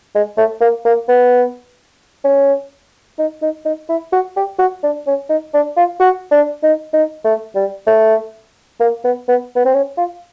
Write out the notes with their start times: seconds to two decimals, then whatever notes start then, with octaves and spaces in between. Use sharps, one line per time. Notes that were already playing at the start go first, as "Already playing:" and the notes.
0.15 G#3
0.37 A3
0.61 A#3
0.85 A#3
1.09 B3
2.25 C#4
3.19 D#4
3.42 D#4
3.65 D#4
3.89 E4
4.13 F#4
4.37 G4
4.59 F#4
4.84 D4
5.07 C#4
5.29 D#4
5.54 D4
5.77 F4
6.00 F#4
6.32 D4
6.63 D#4
6.94 D#4
7.25 A3
7.56 G3
7.87 A3
8.80 A#3
9.04 B3
9.28 B3
9.56 B3
9.65 C4
9.74 C#4
9.98 F4